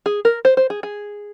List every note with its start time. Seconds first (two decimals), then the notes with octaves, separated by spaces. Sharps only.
0.06 G#4
0.25 A#4
0.45 C5
0.57 C5
0.70 G#4
0.83 G#4